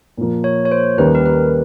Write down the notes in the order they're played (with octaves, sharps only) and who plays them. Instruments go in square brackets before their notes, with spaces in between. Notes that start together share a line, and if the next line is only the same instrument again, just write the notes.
[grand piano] A#2 F3 A#3
[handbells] C#5
C#5
C5
[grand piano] D#2 D#3 G3 A#3 C#4 [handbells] B4
[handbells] A#4
B4